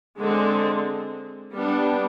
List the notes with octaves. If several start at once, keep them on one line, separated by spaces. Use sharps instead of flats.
D3 G#3 C4
G3 B3 D4